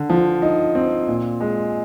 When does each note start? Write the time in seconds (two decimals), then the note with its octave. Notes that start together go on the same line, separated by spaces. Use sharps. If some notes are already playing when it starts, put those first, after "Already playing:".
Already playing: D3
0.10 F3
0.42 D#4
0.75 C4
1.08 A#2
1.41 G#3